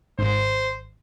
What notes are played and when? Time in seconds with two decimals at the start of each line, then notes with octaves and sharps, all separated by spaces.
0.19 G#1 C5